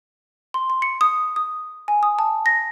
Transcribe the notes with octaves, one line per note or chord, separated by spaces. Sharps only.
C6
C6
C#7
D#6
D#6
G#5
D#6
A5
A#6